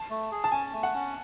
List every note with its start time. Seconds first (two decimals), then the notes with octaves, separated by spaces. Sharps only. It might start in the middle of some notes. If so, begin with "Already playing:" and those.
Already playing: A5
0.10 A3
0.31 G#4
0.44 A5
0.52 C#4 G#5
0.73 A3
0.83 F#5
0.94 C#4